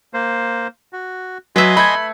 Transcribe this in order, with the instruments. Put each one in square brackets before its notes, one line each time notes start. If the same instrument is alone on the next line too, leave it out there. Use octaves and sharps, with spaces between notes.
[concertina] A#3 C5
F#4
[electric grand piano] F#3 [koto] B4 E5 [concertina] D#5 G#5 C6
[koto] A3 [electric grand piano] B5 G#6